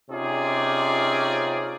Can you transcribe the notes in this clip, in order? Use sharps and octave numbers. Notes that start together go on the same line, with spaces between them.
C3 C#4 D#4 F4 G#4 D5